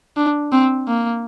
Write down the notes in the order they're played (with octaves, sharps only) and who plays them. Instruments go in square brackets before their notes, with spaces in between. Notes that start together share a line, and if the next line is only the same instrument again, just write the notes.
[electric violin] D4
C4
A#3